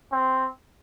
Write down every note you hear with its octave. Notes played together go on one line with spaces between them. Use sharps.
C4